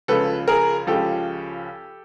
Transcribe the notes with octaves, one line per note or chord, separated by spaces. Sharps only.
C#2 C#3 F3 A4 B4
G#4 A#4
C#2 C#3 F3 G4 A4